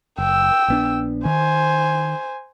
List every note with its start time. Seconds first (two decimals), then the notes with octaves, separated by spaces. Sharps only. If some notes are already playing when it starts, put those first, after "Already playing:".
0.18 F#1 G5 E6
0.68 A#1 B3 D4
1.25 D#3 C5 G#5